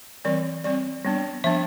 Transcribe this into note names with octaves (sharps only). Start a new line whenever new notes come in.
E3 G3 C4 D5
G3 C4 D5
G3 B3 D4
F3 B3 D4 E5